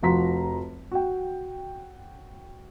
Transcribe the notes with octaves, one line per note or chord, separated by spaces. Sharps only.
F1 F3 F#4 A#5 C6 B6
F#4 G5